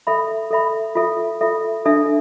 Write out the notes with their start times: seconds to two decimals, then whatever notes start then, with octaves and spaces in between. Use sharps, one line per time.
0.07 A4 E5 B5
0.50 A4 E5 B5
0.95 F4 A4 E5
1.41 F4 A4 E5
1.86 D4 A4 E5